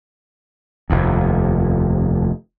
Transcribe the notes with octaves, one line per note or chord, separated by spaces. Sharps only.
F1 D#2